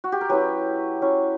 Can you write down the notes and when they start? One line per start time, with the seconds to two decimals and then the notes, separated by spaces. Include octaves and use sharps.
0.04 F#4
0.12 G4
0.21 A#4
0.29 F#3 C#4 E4 G4 B4
1.02 F#3 C#4 E4